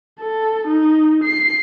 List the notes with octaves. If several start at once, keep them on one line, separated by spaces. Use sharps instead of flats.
A4
D#4
C7